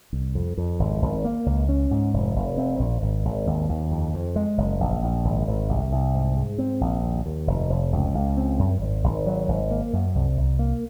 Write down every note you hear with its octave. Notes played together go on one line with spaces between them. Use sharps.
C2
F2
F2
G#1
G#1
A#3
C#2
C#4
G#2
F1
F1
C4
A#1
G#1
G#1
D#2
D#2
F2
F2
G#3
F#1
A#1
A#1
G#1
G#1
C2
C2
G#2
G#2
C4
A#1
D#2
D#2
F1
F1
C#2
C#2
C4
F#2
G#1
G#1
F#3
G#1
A#3
F#2
C2
C2
A#3